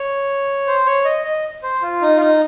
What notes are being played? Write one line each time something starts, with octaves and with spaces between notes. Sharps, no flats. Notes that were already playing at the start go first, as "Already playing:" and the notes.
Already playing: C#5
C5
C#5
D#5
D#5
C5
F4
D#4
F4
D#4